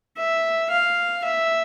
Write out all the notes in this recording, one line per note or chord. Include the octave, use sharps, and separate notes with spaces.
E5
F5
E5